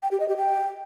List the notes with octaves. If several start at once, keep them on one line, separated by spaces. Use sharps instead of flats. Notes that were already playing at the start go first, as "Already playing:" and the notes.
G5
G4
D#5
G4
G5